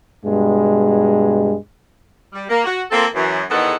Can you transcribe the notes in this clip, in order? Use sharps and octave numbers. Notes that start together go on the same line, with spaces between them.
G2 B2 G#3
G3
A#3
F#4
A#3 C4 F4 A4
F#2 E3
E2 G#2 D#3 B3 A4 F#5